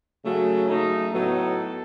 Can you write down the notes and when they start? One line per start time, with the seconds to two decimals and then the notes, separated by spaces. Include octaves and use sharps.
0.24 C#3 F#3 A3
0.68 C#3 F#3 A3 D#4
1.13 A2 F#3 B3 D#4 A4